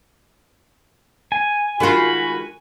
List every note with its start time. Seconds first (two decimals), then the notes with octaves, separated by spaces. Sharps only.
1.32 G#5
1.80 D#3 G#3 F4 F#4 B5